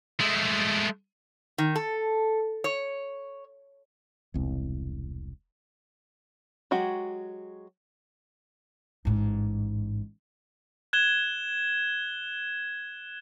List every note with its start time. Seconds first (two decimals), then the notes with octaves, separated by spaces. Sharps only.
0.21 G#3 A3
1.58 D#3
1.75 A4
2.64 C#5
4.34 E1 C2
6.71 F#3 G#3 F#4 G4
9.05 A1 G#2
10.93 F#6 G#6 E7 G7